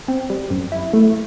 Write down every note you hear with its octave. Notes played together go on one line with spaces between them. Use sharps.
C4
G3
F#2
E4
A3